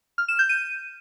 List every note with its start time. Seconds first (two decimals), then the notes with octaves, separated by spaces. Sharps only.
0.18 F6
0.28 E7
0.39 G6
0.49 D#7